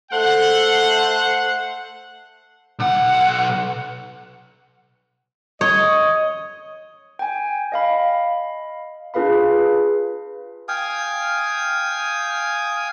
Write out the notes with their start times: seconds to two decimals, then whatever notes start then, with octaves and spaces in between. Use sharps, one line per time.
0.12 A3 A4 C5 F#5
2.79 B1 F#5
5.61 C#5 D#5
7.19 G5 G#5
7.72 D#5 F5 B5
9.14 D4 F4 G#4 B4 F5 B5
10.68 F5 G5 G#5 D#6